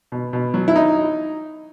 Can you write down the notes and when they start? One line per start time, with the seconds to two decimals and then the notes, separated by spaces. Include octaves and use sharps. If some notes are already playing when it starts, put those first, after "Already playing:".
0.12 B2
0.33 B2
0.54 F#3
0.68 E4
0.76 D#4